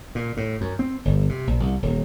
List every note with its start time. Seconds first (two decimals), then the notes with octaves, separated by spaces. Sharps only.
0.15 A#2
0.37 A2
0.61 F#2
0.79 C4
1.05 G1
1.29 C3
1.47 A#1
1.60 C2
1.82 D#1